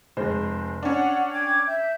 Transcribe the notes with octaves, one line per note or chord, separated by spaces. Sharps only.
F1 G#3 C5
C#4 D4 F#5
G5 D6 G#6
E5 G6